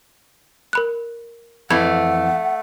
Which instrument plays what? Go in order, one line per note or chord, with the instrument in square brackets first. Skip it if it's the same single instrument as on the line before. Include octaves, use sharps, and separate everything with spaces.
[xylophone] A#4 B5 F#6
[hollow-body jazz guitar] F2 E3 [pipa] A3 [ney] F#5 [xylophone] B5 G#6